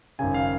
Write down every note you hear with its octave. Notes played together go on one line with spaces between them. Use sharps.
G#1 F#2 C#3 G#5
F5